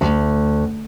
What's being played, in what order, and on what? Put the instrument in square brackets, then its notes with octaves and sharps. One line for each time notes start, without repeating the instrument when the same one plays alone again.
[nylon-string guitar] D2